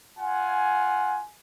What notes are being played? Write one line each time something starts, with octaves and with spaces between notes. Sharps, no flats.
F4 F#5 G#5